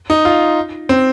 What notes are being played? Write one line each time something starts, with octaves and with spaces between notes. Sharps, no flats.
D#4
F4
C4